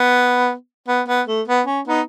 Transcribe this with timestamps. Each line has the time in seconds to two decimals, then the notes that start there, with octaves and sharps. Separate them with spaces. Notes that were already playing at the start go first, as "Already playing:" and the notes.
Already playing: B3
0.88 B3
1.08 B3
1.28 A3
1.48 B3
1.67 C#4
1.87 B3 D#4